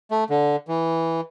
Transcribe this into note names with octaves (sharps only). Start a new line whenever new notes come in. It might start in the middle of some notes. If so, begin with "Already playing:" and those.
A3
D3
E3